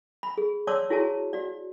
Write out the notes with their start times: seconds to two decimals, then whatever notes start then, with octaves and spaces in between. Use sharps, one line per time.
0.23 B5
0.38 G#4
0.67 C#5 D5 A5 C6 D6 E6
0.90 E4 F#4 G#4 C#5 A5
1.33 F#4 D5